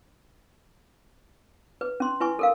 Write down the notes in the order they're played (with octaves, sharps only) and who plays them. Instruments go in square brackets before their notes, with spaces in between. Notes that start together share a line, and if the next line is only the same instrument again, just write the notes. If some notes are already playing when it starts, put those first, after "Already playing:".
[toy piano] B4
C#4 C6
E4 B4 G#5 C#6
A4 A#4 F5